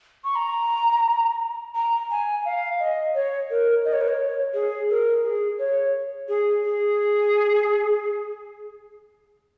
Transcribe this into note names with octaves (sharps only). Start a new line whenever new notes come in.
C#6
A#5
A#5
G#5
F5
D#5
C#5
A#4
D#5
C#5
A#4
C#5
G#4
A#4
G#4
C#5
G#4
G#4